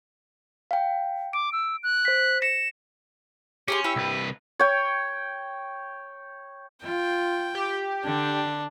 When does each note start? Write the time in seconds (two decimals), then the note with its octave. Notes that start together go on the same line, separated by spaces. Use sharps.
0.71 F5 G5
1.33 D6 D7
1.52 E6
1.83 F#6
2.05 C5 B6
2.42 A#6 C#7 E7
3.68 C#4 G4 G#4 C6
3.84 E4 G4 E6
3.96 C2 B4
4.59 C#5 G5
6.83 F4 G5
7.55 G4
8.05 D3 D4